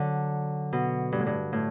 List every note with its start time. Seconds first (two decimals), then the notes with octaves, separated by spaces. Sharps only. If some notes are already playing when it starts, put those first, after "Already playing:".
Already playing: D3 F#3
0.73 B2
1.12 G2
1.19 A2
1.26 G2
1.53 A2